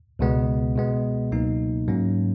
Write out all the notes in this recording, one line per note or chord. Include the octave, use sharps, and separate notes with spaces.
C#2 B2 G#3 B3
B2 G#3 B3
C#2 B2 F#3 A#3 D#4
G#2 F#3 A#3 C#4